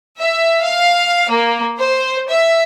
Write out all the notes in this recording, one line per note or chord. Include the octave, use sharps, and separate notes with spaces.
E5
F5
A#3
C5
E5